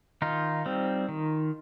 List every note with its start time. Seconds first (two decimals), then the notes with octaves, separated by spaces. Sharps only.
0.22 D#3 D#4 F4
0.66 G3 C4
1.09 D#3